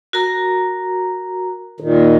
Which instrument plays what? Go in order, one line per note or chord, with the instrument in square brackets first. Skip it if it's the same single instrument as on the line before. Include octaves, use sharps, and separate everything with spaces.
[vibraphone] F#4 A#4 A#5
[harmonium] A#2 D#3